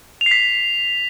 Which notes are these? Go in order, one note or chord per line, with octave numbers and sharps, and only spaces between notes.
F7
C7
B6